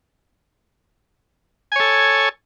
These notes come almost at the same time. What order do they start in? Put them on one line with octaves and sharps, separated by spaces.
G#5 C#5 A4